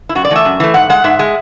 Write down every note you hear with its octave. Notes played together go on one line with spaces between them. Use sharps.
E4
F#2 F#4
D5
E3 A3 E5
F#2
E3 A3
G#2 F#5
G#3 F#5
G#2 E5
G#3